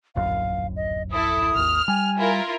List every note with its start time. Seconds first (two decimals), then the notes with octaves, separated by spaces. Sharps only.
0.16 D1 A#1 F#2 F5
0.76 D#5
1.12 E4 A4 D#6
1.55 G#1 D#2 F6
1.88 G3 G#5
2.18 E4 F4 A#4